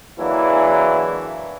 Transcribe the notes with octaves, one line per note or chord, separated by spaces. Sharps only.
E3 F#3 G#3 A#3 D4 E4